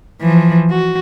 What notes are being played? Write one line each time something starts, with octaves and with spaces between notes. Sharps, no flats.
E3 F3
F#4